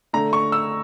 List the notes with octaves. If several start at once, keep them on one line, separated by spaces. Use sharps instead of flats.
D3 A3 A#5
C#6
E6